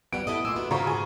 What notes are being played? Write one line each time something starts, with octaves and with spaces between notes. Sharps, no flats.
G2 G3 B3 F#5 D7
E4 A4 D#5 D#6
A#2 A3 G#5 C6 D6 E6
B3 D4 F#4
C#3 F4 C5 A#5 C#6
G#2 G#4